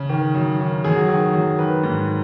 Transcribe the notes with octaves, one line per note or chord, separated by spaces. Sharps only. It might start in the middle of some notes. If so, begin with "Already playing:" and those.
Already playing: C#3
D#3
F#2
D#3
F#2 G#4
F#4
D#3 G#4
F#2
D#3 B4
G#2